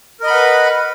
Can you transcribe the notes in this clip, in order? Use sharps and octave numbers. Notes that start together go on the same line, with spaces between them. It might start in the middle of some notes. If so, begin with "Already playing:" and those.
A#4 B4 D#5 F#5 B5